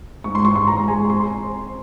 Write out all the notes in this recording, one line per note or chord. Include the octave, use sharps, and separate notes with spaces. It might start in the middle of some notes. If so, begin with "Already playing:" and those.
G#2 C#6
C6
G#2 C#6
C6
G#2 A#5
G#3 G#5
C4 C6
C4
C4